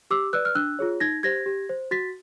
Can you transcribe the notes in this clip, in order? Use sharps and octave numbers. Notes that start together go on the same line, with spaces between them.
G4 D6 E6
B4 D5 E6 F#6
F6
D4 E6 F#6
F4 G#4 C#5
D#4 G#6 A#6
G4 C5 G#6 A#6
G4
C5
F#4 A6 B6